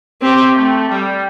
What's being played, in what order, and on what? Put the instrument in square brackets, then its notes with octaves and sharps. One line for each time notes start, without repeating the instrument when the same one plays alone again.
[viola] C4 [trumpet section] G4
[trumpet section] A3
G3